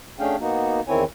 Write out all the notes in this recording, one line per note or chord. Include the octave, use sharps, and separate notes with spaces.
A3 C#4 D4 G#4 F5 G5
A#3 B3 D#4 F#4
E2 D#3 C4 E4 C#5 G#5